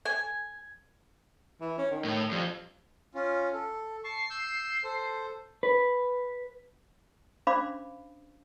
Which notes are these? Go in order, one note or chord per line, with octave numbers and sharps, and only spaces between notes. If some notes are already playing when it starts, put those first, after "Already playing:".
G#5
E3
C#4
D#3
A2
F2 G3
C#4 F4
A4
A5 C#6 C7
E6 G6
A4 C5
B4
C#4 D4 C5 F5 B5 D6